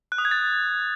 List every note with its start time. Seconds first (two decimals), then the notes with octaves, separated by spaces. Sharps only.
0.12 F#6
0.18 D#6
0.25 G#6
0.31 A6